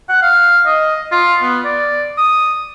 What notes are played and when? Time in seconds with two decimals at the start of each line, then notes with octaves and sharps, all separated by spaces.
0.09 F#5
0.22 F5
0.66 D#5
1.12 F4
1.42 B3
1.65 D5
2.18 D#6